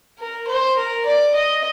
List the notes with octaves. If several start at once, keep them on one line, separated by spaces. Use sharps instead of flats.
A#4
C5
A#4
D5
D#5